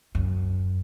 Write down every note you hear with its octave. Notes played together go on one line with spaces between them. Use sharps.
F#2